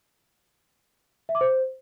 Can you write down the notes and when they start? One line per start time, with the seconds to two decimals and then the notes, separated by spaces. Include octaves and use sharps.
1.29 E5
1.35 D6
1.41 C5